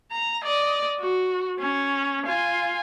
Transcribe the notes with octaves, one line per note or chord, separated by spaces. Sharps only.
A#5
D5 D#5
F#4
C#4
F4 G#5